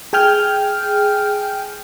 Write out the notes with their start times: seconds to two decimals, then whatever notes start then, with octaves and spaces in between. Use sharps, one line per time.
0.13 G#4 G5 G#5 F6 G6